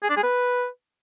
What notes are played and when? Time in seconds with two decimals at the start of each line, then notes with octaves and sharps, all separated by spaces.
0.03 G#4
0.10 D4
0.16 G#4
0.23 B4